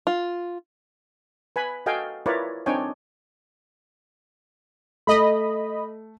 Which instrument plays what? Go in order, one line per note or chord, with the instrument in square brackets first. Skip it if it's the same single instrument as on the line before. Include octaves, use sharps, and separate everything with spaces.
[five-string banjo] F4
[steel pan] B4 G#5 B5
F#4 A4 D#5 F5 G5 G#5
E4 F4 A#4 B4 C#5 D5
C4 D4 D#4 C#5 G5 G#5
[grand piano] A3 [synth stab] D#5 B5